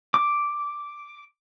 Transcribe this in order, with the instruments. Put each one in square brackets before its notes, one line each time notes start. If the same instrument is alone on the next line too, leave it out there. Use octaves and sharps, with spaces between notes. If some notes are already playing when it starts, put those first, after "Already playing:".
[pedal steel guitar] D6